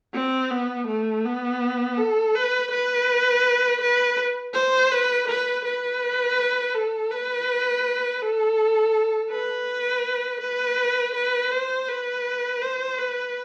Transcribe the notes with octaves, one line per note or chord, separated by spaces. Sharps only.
C4
B3
A3
B3
A4
B4
B4
B4
C5
B4
B4
B4
A4
B4
A4
B4
B4
B4
C5
B4
C5
B4